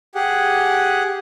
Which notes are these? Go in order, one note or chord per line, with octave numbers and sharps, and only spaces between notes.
G4 G#4 F#5